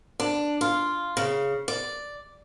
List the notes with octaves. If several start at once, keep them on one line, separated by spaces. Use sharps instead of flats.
D4
F4
C#3
D5